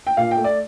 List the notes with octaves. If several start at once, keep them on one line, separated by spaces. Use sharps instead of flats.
G5
A#2 F5
G5
A3
D5